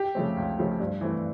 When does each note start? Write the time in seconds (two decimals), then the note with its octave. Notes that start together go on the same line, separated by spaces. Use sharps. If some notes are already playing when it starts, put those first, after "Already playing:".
Already playing: G4
0.15 C#3 F3 A3 C4
0.37 C#2
0.59 C#3 F3 A3 C4
0.80 G2
1.01 E3 A3 C4